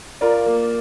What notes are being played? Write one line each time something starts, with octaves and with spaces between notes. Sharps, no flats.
F4 A#4 D5
A#3